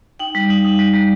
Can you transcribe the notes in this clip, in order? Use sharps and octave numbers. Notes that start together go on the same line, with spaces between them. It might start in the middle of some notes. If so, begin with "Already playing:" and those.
D#4 G5
G3
D#4
D#4
G3
G3